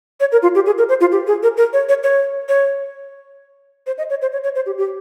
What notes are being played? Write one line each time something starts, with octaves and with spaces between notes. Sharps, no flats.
C#5
A#4
F4
G4
G#4
A#4
C5
F4
G4
G#4
A#4
A#4
C#5
C#5
C#5
C#5
C5
D#5
C#5
C5
C#5
C#5
C5
G4
G4